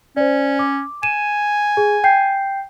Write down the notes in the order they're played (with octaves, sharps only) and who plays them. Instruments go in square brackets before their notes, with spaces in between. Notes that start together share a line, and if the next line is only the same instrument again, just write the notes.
[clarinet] C#4 [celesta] C5 D5
[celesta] D6
[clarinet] G#5 [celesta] D#7 E7
[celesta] G#4
G5 G6 C7